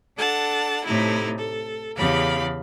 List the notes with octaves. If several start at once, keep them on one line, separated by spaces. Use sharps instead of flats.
D4 A4 F#5 A5
A2 C3 A3 D#4 E4
A4
E2 C#3 G4 F5 B5